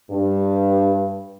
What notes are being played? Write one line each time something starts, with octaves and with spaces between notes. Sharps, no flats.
G2